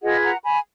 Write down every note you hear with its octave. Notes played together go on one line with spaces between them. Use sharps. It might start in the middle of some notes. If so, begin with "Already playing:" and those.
F4 G#4 B4 D#5 F#5
F#5 A#5
G#5 B5